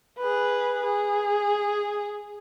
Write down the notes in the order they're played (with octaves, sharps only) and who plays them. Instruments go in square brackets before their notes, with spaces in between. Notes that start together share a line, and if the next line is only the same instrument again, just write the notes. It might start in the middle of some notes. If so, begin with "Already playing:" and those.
[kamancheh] G#4 B4
G#4